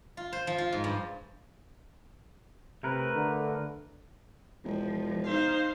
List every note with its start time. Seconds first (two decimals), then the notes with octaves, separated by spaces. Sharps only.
0.17 F4
0.33 C5
0.47 F3
0.58 F4
0.72 G#2
0.84 G2
2.83 C3 A3 A#4 B4
3.15 D3
4.65 E1 F3
5.27 D#4 C5 F5